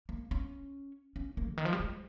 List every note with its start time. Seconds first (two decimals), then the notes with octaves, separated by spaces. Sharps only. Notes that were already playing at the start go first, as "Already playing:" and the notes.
0.09 A#3
0.31 C#4
1.16 C#4
1.37 A#3
1.50 C#3
1.57 D#3
1.65 F3
1.73 G3
1.80 G#3